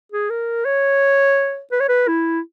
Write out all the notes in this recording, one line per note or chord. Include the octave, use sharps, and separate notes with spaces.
G#4
A#4
C#5
B4
C#5
B4
E4